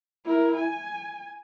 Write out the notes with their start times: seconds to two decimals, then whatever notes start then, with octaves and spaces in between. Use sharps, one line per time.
0.25 E4 A#4
0.56 G#5